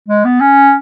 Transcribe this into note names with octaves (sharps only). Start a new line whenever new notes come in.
G#3
B3
C#4